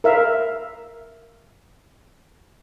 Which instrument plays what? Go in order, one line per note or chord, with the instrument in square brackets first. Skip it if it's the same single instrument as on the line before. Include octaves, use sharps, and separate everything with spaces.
[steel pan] A#4 E5 F5